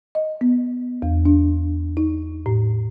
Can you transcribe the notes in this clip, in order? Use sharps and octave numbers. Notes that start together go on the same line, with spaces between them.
D#5
B3
E2
D4
D#4
A2